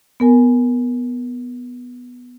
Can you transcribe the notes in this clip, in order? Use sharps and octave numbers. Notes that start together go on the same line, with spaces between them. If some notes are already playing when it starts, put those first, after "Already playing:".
B3 A#4 G#5